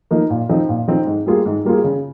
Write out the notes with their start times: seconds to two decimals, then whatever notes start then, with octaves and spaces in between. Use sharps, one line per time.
0.11 F3 A#3 D#4
0.30 A#2
0.49 F3 C4 D#4
0.69 A#2
0.88 F3 C4 D#4
1.07 G#2
1.26 G3 A#3 F4 G#4
1.46 G#2
1.65 G3 A#3 F4 G#4
1.84 C#3